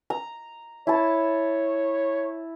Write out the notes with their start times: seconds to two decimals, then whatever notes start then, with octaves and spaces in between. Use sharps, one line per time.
0.10 A#5
0.87 E4 C#5 A5